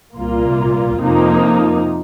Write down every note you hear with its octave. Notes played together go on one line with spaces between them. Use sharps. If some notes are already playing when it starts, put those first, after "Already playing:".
C2 A#2 A#3 F4
F2 C3 F3 A#3 D#4